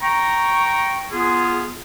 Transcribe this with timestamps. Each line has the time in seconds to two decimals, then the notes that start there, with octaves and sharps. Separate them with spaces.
0.01 G5 A#5 C#6
1.11 B3 F4 G#4